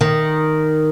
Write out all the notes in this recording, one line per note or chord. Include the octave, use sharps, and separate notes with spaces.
D#3